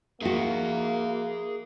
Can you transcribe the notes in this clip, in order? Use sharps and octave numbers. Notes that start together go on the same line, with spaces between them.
A#3 D#4 F#4 G#4 E5